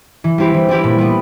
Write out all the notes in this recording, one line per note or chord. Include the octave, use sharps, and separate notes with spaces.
E3
G3 C4 E4 G4
E3
G3 C4 E4 G4
A#2
G3 B3